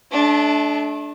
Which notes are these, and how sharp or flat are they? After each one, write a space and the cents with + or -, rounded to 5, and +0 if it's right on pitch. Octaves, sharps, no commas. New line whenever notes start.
A3 -35 D4 +0